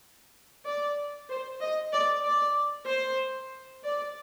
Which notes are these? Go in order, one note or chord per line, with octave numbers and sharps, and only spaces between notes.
D5
C5
D#5
D5
D5
C5
D5